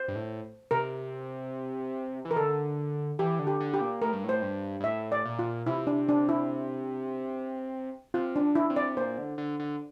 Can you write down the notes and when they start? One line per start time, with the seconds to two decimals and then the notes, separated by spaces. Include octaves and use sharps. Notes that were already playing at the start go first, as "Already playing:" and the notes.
Already playing: C5
0.08 G2
0.15 A2
0.71 C3 A#4
2.25 E3
2.31 A#4
2.36 D3 A4
3.19 E3 G4
3.39 D3
3.47 G4
3.60 D3
3.74 G4
3.81 A#2
4.01 A2 A#4
4.13 G2
4.24 A2 C5
4.42 G2
4.80 G2
4.84 A2 E5
5.12 D5
5.25 A#2
5.39 F4
5.67 C3 E4
5.87 D4
6.09 D4
6.29 E4
8.14 C3 F4
8.36 D4
8.42 D3
8.55 E4
8.70 C3
8.76 D5
8.97 A#2 C5
9.18 D3
9.38 D3
9.59 D3